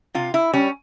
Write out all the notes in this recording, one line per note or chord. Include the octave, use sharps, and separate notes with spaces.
C3 F4
E4
G3 C#4